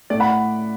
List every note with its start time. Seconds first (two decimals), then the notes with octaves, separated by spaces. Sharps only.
0.10 A2 A3 D5
0.20 F#5 B5